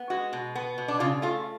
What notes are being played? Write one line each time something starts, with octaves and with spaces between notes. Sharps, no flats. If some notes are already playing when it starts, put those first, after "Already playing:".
Already playing: B3
G#3 F#4
B2
B3
B2
D4
C#3 F4
A3 F4